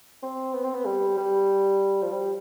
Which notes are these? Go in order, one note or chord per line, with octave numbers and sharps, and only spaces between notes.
C4
B3
C4
B3
G3
G3
F3
G3